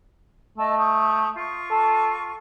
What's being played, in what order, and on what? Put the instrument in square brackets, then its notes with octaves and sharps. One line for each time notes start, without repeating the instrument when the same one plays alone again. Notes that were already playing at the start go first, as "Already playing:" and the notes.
[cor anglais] A3 [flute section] D#5 A5 E6
[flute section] C#6 D#6 G6
F4 C#6
[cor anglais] A4